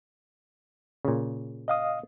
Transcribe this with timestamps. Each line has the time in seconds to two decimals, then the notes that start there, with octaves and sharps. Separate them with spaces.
1.05 A#2 C#3
1.68 D#5 F5 D#6